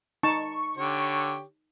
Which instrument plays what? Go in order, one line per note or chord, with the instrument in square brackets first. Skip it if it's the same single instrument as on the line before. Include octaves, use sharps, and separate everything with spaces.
[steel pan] D#4 A5 [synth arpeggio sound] C#6
[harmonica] D3 G4 C#5